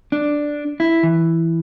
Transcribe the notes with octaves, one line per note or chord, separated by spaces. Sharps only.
D4
E4
E3